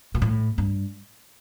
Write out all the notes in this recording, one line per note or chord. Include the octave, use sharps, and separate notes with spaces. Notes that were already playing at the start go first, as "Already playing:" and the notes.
B2
A2
G2